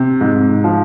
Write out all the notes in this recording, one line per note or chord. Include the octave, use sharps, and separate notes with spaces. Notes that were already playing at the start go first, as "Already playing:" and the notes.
Already playing: C3
G#2
F3